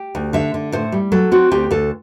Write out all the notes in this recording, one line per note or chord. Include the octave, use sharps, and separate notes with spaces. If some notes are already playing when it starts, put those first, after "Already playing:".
Already playing: G4
D2
D3 E5
D3
A2 C5
G3
F#3 A4
C4 F#4
D2 G4
D2 A4